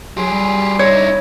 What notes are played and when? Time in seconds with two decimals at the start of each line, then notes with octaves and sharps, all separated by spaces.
0.17 F#3 G4 G#4 C6
0.31 G3
0.79 D#4 E4 C#5